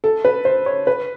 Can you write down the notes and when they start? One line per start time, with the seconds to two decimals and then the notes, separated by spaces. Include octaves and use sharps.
0.04 A4
0.25 B4
0.45 C5
0.66 C#5
0.87 B4